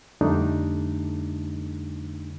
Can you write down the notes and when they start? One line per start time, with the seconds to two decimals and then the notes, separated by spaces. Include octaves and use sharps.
0.21 F2 D3 G3 A3 D4 D#4